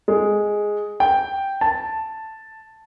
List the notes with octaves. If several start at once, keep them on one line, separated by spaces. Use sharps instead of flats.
G#3
G5
A5